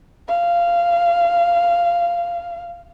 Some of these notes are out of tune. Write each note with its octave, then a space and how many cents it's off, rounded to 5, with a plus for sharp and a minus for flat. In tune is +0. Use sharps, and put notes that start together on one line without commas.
F5 -15